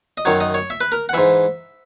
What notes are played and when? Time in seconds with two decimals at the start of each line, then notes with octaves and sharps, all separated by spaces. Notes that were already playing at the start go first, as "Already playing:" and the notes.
0.17 D#5
0.25 F#2 D#3 F#3 C#5
0.41 D#5
0.54 C#5
0.70 E5
0.81 B4
0.92 A#4
1.09 F#5
1.13 G#2 E3 E5